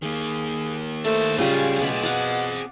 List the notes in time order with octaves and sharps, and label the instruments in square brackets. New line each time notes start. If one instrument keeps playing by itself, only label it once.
[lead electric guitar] D#3 A#3 [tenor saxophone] G#4
[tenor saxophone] A3 [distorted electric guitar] D4 C5
[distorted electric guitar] A2 F#3 [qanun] C#3 F4 B5 [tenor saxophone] G3 [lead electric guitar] G#4
[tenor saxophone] B2 [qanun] D5 B5
[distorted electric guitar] C4 A5 [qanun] D5 F5 F#5